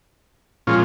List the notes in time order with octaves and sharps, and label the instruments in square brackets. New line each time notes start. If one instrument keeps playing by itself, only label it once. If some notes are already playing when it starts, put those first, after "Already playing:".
[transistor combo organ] A#2 F3 G#3 C#4 F4